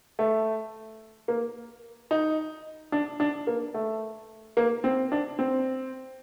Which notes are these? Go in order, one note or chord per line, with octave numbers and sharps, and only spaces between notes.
A3
A#3
D#4
D4
D4
A#3
A3
A#3
C4
D4
C4